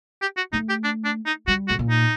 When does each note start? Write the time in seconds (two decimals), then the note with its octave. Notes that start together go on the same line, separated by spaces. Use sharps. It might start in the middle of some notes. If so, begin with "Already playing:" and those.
0.22 G4
0.37 F#4
0.53 A3 D#4
0.69 G4
0.84 D4
1.05 D4
1.26 D#4
1.48 G3 F#4
1.68 A2 F#4
1.79 A#2
1.90 D#4